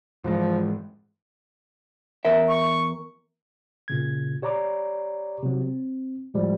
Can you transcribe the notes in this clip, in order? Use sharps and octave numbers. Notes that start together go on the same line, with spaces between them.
G#2 E3 F3 G#3
E2 A#4 E5
C#6
A#2 C#3 G#6
G4 C#5 D5 A#5 B5 D6
C3 F#3
C4
A2 F3 G3 G#3